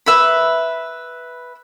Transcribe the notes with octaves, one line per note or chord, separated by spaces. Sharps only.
B4 E5 B5